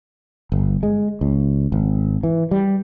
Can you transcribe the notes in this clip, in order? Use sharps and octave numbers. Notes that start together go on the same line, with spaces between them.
G1
G#3
C#2
G#1
E3
G3